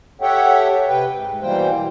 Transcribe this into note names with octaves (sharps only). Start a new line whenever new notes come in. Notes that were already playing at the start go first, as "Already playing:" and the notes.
G4 A4 C#5 E5 F#5 G5
C3 B4 G5
G#2
B2 E3 G3 A#3 C5 G5